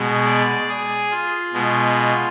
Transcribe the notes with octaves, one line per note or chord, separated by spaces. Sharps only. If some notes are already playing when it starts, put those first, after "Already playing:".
Already playing: B2 G#3
D5
G#4
F4
B2 G#3